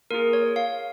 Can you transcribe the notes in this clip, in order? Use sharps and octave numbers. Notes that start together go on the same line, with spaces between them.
A#3 F4 G#4 A#4
C#5
F5